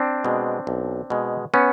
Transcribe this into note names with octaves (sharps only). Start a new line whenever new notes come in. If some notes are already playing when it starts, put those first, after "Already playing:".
Already playing: C4 D4
B2 G#3
B1
B2 G#3
B3 C#4